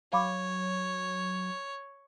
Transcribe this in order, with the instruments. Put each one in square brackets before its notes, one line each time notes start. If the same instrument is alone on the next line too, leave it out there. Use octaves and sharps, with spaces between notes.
[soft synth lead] F#3 [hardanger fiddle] C#5 [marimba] F5 B5 D6